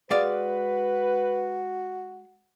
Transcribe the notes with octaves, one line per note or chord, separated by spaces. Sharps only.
G#3 F#4 B4 D5 F5